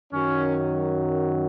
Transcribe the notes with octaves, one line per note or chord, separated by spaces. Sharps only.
F#2 D#3 F#3 C#4